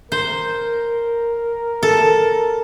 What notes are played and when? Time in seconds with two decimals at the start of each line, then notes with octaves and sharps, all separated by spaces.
0.12 A#4 C5
1.83 A4